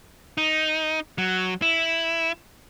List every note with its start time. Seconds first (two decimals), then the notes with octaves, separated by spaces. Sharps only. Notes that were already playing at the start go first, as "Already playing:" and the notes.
0.38 D#4
1.18 F#3
1.62 E4